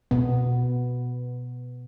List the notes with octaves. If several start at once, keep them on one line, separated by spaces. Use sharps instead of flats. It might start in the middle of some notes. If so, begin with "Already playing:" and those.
B2 B3